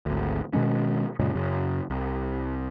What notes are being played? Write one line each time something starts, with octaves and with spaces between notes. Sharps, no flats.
G#1 D2
B2 D#3 G#3 C#4
F#2 A#2 C#3 G#3
F#2 C#3
C2